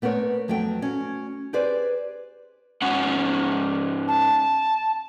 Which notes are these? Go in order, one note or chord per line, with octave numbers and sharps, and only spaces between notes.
A3 B3 C4 A#4 C#5
F2 F#3 A3 B3 G5
C#4 F#4
G4 G#4 B4 C5 D5
G#2 C#4 F#5
A5